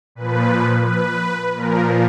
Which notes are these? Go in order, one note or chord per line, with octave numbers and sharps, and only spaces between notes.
A#2 F3 B4
B4
A#2 F3 A#4